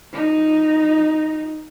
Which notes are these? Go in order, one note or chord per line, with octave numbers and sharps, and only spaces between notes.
D#4